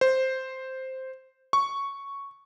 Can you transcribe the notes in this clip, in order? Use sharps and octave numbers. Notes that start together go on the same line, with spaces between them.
C5
C#6